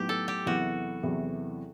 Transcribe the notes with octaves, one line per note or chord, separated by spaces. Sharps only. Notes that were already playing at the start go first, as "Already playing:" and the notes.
Already playing: A2 F#3 B3 D#4 G4
A4
G4
E2 C3 F#3 B3 E4 F#4
E2 C3 F#3 B3 E4